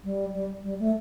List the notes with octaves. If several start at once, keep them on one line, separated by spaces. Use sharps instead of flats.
G3
G3
G3
A3